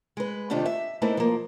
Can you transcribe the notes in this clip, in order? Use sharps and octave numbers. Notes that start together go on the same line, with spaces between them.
G#3 B4
C3 D#3 A3 D4 F4 G4
E5
A3 A#3 C4 D#4 E4 B4
F3 A#3